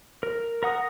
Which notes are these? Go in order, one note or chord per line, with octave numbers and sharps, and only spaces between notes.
A#4
A#4 F#5 D#6